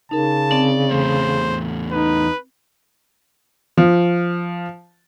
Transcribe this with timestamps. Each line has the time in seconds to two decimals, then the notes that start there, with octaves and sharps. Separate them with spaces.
0.11 C#3 D#4 A#4 A5
0.52 C4 D5
0.91 E2 A3 C5
1.92 D#4 B4
3.77 F3